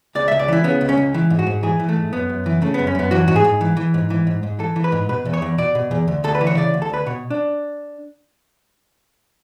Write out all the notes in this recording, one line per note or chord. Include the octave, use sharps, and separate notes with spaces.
C#2 D5
C#2 E5
D5
E3 E4
C#3 B3
C#2
C#4
C#2
E3
G#2
F#4
G#2
E3 G#4
E3
A3
G#2
F#2 B3
F#2
E3
C#3 A3
F#2 B3
C#4
F#2 B3
E3 F#4
G#2 F#4
G#4
G#2
E3
E3
G#2
E3
G#2
G#2
E3 A4
E3
B4
G#2
B2 B4
E2
C#5
E2
B2 D5
B2
E2
D2
D2 A4
B4
E3
C#5
C#3 D5
D2
A4
D2 B4
B2 C#5
D4